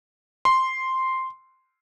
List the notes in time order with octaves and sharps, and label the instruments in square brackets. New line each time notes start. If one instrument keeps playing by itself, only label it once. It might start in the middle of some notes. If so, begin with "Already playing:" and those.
[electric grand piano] C6